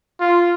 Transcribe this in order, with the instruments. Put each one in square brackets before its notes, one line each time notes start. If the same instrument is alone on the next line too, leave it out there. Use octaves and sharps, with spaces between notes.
[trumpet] F4